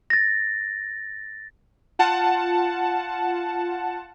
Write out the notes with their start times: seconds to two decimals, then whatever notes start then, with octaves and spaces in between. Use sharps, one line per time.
0.10 A6 A#6
1.99 F4 F#5 A5